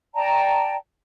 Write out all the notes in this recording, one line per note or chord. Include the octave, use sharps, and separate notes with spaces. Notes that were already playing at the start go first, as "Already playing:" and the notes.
D5 G5 A5 A#5